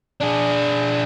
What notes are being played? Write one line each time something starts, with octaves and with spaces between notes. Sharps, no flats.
D4 G#4